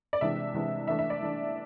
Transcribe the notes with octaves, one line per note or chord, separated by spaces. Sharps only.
D5
C3 E3 G#3 D4 E5
C3 E3 G#3 D4
E3 A3 D4 E5
E5
D5
E3 A3 D4